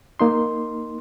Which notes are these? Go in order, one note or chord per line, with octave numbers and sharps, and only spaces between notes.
A#3 D#4 C6